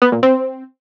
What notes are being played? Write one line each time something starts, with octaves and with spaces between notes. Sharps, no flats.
B3
A#2
C4